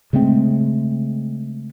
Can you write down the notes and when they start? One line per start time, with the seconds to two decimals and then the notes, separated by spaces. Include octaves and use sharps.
0.13 C#3 G#3 A3 C4